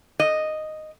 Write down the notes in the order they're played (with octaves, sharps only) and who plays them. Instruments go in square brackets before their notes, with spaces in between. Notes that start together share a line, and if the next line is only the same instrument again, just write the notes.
[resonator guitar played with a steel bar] D#5